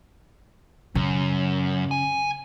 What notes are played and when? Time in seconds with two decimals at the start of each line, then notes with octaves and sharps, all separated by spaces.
0.95 F#2 C#3
1.91 G#5